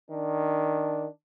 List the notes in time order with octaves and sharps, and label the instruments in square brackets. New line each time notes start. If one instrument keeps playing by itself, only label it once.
[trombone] D#3 [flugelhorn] D4